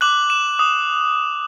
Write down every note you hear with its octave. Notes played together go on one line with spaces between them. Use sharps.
D6 F#6 F#7
E7
D#6